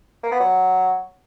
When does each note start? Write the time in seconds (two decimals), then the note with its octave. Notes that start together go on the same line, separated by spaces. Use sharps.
0.23 A#3
0.32 B3
0.40 F#3